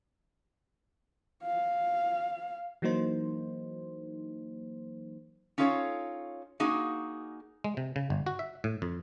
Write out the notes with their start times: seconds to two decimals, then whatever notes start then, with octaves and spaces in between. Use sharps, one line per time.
1.43 F5
2.82 E3 F#3 A#3 D#4 C5
5.58 C#4 D#4 F4 A4 C#5
6.60 A#3 D#4 F#4 G#4
7.64 G#3
7.77 C3
7.96 C#3
8.10 G1
8.26 F#4
8.39 E5
8.64 A2
8.82 F2